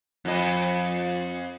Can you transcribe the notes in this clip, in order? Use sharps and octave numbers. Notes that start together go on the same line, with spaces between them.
F2 D#5